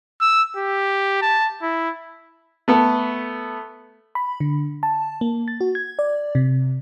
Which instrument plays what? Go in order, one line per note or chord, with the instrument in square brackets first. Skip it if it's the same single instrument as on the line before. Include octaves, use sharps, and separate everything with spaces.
[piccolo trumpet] E6
G4
A5
E4
[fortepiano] A3 B3 A4
[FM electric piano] B5
D3
A5
A#3
A6
F#4
G#6
D5
C3